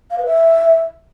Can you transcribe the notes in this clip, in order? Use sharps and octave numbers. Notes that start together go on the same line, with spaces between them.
F5
B4
E5